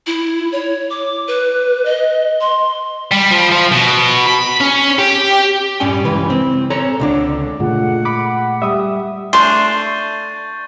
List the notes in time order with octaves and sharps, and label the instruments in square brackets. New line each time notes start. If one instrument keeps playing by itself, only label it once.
[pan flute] E4
C#5
D6
B4
D#5
C6
[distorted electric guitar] G3
F3
F3
B2
B5
C#4
G4
[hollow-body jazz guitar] G2 G3 C#4 G5 G#5
C#2 E3 B4
C4
A4 C#5 A#5
C#2 D3 D4
[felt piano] A#2 G#3 A3 [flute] F#5
[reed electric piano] B5 D6
[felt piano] G3 [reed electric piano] E5 D#6
[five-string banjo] A3 D4 [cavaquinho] C6 [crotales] C#6 G6 A6